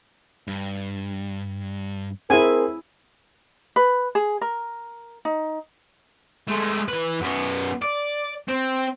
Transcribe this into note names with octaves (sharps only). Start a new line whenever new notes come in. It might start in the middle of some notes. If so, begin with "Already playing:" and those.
G2
C4 E4 G#4 A#4 G#5
B4
G#4
A#4
D#4
G#3 A3
E3 B4
F#2 B3
D5
C4